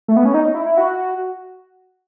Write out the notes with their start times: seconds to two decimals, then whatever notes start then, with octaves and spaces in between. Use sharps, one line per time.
0.08 A3
0.17 B3
0.25 C#4
0.34 D#4
0.55 E4
0.66 E4
0.77 F#4